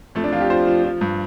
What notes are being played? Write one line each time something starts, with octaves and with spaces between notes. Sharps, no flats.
F2 A3
D4
F2 F4
G4
F3 C5
F3
F3
G2